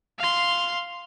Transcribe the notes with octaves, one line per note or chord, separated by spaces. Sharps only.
F5 C6